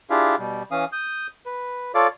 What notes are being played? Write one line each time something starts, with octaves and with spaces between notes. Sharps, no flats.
D4 E4 F4 G4 G#4 F5
B2 G3
E3 C#4 F5 D#6
D#6 G6
B4
F4 A4 C#5 D5 F5 D6